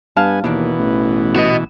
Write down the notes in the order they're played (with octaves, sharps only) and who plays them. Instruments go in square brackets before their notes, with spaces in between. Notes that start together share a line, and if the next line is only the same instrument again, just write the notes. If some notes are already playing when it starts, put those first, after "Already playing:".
[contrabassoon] G2 [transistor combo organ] B3 G#5 [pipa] F5 A5
[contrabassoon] D#2 [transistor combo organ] B2 E3 [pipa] D#3 A#3 D4
[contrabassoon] A1
[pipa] B3 [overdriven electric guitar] F#4 D#5